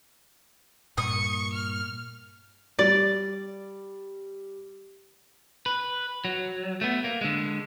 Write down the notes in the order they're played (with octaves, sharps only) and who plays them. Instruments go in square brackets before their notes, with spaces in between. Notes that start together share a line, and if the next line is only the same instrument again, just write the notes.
[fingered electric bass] G2 A#2 A#3 [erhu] C#6 [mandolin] D#6
[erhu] F6
[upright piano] G3 [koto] D5
[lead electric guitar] B4
F#3
A3 B3
A#3
D3 G#3